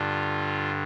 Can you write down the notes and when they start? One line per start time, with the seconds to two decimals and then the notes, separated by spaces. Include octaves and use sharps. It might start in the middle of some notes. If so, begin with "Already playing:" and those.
Already playing: G2 D3 F4